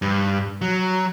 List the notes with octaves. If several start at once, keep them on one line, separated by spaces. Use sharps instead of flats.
G2
F#3